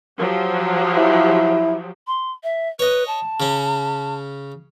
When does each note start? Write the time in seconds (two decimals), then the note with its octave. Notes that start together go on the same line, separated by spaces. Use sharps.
0.18 F3 F#3 G4
0.97 E4
2.07 C6
2.44 E5
2.79 B4 C#5 D#5
3.08 A5
3.40 C#3 C#4